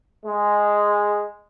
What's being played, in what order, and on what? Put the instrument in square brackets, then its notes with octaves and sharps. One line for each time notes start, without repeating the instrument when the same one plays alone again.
[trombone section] G#3